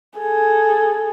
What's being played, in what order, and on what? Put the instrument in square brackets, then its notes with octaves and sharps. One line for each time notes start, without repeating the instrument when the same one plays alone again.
[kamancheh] G#4 A4